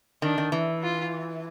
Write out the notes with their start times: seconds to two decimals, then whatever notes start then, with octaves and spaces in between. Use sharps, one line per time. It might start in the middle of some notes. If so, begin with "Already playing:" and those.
0.22 D#3 D4
0.38 D#3
0.52 E3
0.83 F4